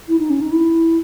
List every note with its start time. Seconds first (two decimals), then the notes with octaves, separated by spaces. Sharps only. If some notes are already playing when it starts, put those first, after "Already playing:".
0.08 E4
0.19 D#4
0.30 C#4
0.41 D#4
0.52 E4